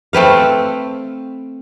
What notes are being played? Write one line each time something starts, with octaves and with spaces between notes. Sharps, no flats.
A3 C4 B4 F5